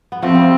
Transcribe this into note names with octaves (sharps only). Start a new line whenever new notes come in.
B3
F3 A3 C4
G3